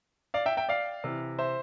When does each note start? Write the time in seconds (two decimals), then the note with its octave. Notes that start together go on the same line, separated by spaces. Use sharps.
0.34 D5 F5
0.46 E5 G5
0.57 E5 G5
0.69 D5 F5
1.04 C3 E3
1.39 C5 E5